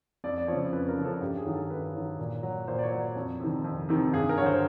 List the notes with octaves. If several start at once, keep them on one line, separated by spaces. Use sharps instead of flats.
F2 D5
D5
C#3 F3 C#5
F2 B4
A#4
C#3 F3
A4
G2 G4
G#4
D#3 F#3
A4
G2 B4
D#3 F#3
A#2
F#3
A#2 C5
D5
C#5
F#3
F2
C3 D#3
F2
C3 D#3
G2 G#4
A#4
D3 F#3 C#5
C5